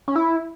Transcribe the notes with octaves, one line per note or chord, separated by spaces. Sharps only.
C#4
E4